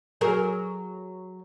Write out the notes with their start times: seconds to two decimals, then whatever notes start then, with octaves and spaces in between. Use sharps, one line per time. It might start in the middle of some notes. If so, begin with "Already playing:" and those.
0.21 F#3 G#4 A#4